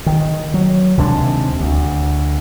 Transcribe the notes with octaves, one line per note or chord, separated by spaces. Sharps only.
D#3
F#3
D#2 C3 G#3 D4
D2